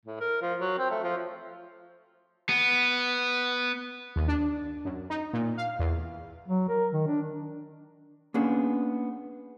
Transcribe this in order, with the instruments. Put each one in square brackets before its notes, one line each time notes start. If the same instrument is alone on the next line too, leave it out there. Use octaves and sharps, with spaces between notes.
[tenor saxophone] A2
A#4
F3
F#3
C4
A3
F3
[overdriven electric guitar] B3
[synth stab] D#2
D4
F#2
D#4
A#2
F5
E2
[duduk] F#3
A#4
D#3
D4
[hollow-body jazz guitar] A#3 B3 C#4 D4 G#4